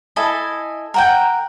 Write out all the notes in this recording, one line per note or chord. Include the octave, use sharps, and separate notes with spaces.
E4 A4 D#5 G#5
A#4 F#5 G5